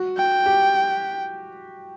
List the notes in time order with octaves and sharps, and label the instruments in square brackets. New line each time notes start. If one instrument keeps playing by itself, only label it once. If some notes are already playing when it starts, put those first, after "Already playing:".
Already playing: [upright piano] F#4
[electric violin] G5
[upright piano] G4